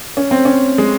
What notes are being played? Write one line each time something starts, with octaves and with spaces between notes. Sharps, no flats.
C#4
C4
C#4
G#3